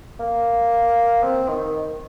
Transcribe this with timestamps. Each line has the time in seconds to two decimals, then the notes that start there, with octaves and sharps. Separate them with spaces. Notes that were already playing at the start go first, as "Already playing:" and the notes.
0.20 A#3
1.23 C4
1.49 D#3